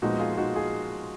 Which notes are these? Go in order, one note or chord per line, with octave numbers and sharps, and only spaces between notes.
A#2 F3 G#3 B3 D#4 F#4
F4 G#4
D#4 F#4
F4 G#4